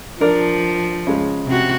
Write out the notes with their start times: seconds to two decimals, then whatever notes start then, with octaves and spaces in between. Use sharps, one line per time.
0.20 F3 D4 A#4 D5
1.07 C#3 G#3
1.46 C3 F#4